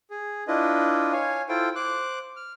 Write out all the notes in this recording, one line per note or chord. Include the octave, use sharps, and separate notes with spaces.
G#4
D4 E4 F4 B4 D#5
C#5 F5 G#5
E4 F4 A4 C5 G5
C5 D6 F#6
F6